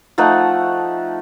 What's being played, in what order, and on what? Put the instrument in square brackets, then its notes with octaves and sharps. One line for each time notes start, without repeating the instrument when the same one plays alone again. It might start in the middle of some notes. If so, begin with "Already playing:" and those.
[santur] F3 A3 D#4 F#5